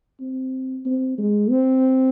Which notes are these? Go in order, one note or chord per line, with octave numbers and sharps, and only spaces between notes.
C4
C4
G#3
C4